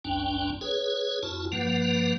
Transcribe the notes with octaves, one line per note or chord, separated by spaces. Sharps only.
G1 C2 F#2 C#4 D4 G5
G#4 B4 C#5
F2 E4 F#4 A5
G2 F3 A#3 B4 F#5